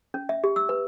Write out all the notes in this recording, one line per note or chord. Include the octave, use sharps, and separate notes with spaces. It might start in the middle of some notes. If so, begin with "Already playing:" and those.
C#4
E5
G4
E6
B4